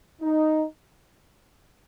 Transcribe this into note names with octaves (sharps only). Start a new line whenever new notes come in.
D#4